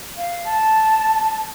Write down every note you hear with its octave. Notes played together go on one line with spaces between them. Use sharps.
F5
A5